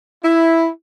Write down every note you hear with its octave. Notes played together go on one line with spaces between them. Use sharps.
E4